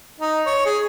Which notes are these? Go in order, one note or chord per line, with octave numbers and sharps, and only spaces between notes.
D#4
C#5
G#4